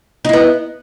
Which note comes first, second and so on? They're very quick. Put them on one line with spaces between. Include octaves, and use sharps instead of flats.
D#4 E4 B3